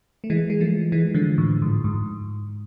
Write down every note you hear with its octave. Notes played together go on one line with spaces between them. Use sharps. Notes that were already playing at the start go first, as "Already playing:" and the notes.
A3
E3 G#3
G#3
F3 A3
E3 G#3
D3 F3
A2
G#2
G#2